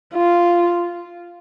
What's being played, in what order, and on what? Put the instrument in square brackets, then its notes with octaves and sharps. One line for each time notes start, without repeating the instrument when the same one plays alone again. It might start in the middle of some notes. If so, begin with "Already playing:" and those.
[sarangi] F4